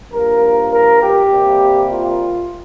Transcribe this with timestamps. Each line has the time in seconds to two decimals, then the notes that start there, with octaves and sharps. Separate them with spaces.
0.13 G2 F3 A#3 A#4
0.73 A#4
1.02 G4
1.31 C3 G3 A#3
1.90 F4